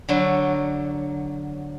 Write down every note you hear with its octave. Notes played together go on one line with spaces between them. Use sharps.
D3 F#3